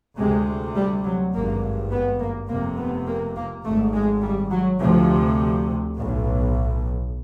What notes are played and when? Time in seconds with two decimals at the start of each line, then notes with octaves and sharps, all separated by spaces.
0.18 D2 C3 G#3
0.76 G3
1.04 F#3
1.33 G#1 G2 A#3
1.92 B3
2.20 A#3
2.49 F1 F2 C3 A#3
2.78 B3
3.07 A#3
3.35 A#3
3.64 G#1 G#2 A3
3.94 G#3
4.23 G3
4.51 F#3
4.81 D2 C3 F3
5.96 B1 A2